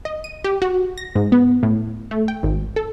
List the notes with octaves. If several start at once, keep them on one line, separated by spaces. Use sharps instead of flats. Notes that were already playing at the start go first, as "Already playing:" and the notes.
D#5
D#7
G4
F#4
A#6
G#2
B3
A2
A3
G5
G#1
A4